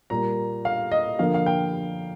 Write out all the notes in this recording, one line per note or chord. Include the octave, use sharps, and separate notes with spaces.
A#2 G3 A#3 A#5
F5
D#5
D3 F3 A#3 F5
F5
G5